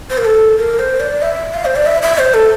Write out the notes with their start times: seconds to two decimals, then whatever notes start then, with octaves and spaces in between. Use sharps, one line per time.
0.10 C5
0.18 A#4
0.25 A4
0.58 A#4
0.79 C5
1.00 D5
1.22 E5
1.54 F5
1.65 C5
1.76 D5
1.86 E5
2.02 E5
2.18 C5
2.34 A4